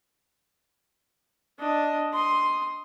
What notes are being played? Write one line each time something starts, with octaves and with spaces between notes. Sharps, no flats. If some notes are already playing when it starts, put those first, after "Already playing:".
D4 D#5
C6 D#6